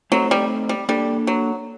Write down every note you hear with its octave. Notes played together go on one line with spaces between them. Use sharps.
F#3 A3 C4 D#4 A4 C5
G3
G3
G3 A#3 D4 A4
F#3